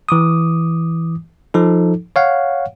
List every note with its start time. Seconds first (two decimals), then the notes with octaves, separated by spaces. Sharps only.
0.09 E3 D6 D#6
1.54 F3 D#4 A4
2.16 C#5 F5 F#5